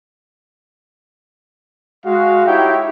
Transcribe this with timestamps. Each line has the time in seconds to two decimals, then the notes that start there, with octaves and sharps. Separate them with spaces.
2.06 G#3 F#4 F5
2.46 D#4 E4 G4 C#5 E5 G5